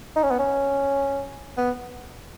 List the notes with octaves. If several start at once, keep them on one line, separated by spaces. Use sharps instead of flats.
D#4
C#4
B3
C#4
B3